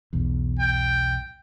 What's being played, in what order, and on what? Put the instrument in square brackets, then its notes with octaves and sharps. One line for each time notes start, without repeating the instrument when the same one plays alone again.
[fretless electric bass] B1 E2
[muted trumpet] G5